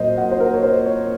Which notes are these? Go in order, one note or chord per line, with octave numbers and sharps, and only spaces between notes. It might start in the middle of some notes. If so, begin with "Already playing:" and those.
Already playing: A#2 F#3 A#4 C5 D#5
F#5
C5
A#4
C#5
C5
C#5